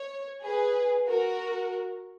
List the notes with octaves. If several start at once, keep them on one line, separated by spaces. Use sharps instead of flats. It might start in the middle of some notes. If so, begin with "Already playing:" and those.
Already playing: C#5
G#4 B4
F#4 A#4